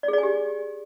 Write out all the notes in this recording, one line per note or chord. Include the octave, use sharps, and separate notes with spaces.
D5
G#4
D5
G#5
G4